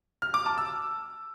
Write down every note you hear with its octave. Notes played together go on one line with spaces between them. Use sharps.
F6
D6
A5
E6